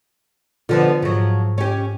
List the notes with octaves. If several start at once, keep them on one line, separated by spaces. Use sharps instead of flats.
D3 F3 B3 F4
G#2 F3 F#3
C#4 G4